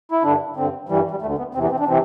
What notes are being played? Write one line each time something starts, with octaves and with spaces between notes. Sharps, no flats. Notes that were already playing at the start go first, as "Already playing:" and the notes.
E4
G2 D3 D4
G2 D3 C4
G2 E3 G3
G3
D2 D3 A3
B3
E2 C3 E3 C4
B3
C4
D4
C3 E3 C4